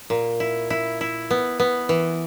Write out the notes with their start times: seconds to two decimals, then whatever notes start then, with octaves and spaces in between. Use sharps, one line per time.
0.10 A#2
0.40 E4
0.70 E4
1.01 E4
1.31 B3
1.60 B3
1.89 E3